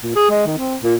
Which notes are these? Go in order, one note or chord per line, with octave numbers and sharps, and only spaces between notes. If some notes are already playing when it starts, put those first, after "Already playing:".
A#2
G#4
G#3
D#3
C4
A#2